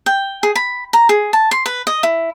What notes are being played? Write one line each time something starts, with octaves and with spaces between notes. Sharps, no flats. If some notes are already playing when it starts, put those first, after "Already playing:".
G5
G#4
B5
A#5
G#4
A5
C6
B4
D#5
E4